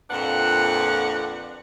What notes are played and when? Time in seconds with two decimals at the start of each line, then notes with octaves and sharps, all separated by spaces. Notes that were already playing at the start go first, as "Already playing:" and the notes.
0.11 F2 A#2 D4 B4 F#5